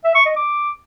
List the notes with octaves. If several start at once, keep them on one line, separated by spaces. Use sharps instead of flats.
E5
C#6
D#5
D6